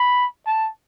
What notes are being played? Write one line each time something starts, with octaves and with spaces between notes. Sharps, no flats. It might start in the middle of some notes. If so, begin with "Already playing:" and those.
Already playing: B5
A5